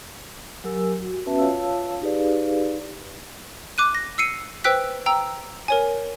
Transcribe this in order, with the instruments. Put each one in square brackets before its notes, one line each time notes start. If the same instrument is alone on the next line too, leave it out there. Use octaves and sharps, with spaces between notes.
[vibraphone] F#3 G4 A#4 G#5 E6
F#4
B3 C#4 F#4 B4 E5 A5
F4 C#5 F5 A5 E6
D#4 G4 G#4 B4 D5 F5
[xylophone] D6 F#6 D#7
A#6
E6 C7 C#7 D#7
B4 C5 G5 E6 F#6 B6
G5 A#5 E6
A#4 C#5 G#5